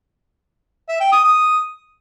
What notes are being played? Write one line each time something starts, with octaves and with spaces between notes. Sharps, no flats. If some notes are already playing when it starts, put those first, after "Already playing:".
E5
G5
D#6
D#6